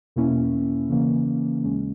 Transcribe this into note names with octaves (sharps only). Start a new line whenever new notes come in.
E2 B2 A#3 C#4 E4
C#3 E3 A#3 C#4
D#2 C#3 G#3 C#4